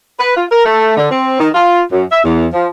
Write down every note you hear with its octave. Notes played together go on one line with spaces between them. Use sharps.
B4
F4
A#4
A3
D3
C4
D#3
F4
F#2
E5
E2
F3